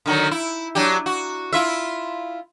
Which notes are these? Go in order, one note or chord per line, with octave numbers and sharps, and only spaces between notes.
D3 D#3 F#3
E4
F#3 D4 G4
F#4
E4 F4 E5